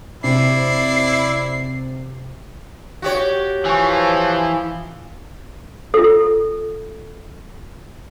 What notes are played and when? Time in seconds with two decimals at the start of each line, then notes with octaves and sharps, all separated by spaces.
0.24 C3 E4 D5 C7
3.02 F#4 G4 C#5
3.66 E3 F3 G#5 C#6
5.94 F4 A4